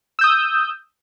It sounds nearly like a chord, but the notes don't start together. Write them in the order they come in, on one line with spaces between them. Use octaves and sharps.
E6 G6 D#6